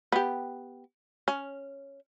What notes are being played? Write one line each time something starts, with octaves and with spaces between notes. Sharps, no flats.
B3 G4
C#4